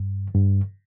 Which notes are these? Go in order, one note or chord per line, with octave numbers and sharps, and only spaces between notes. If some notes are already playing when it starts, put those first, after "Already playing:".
Already playing: G2
G2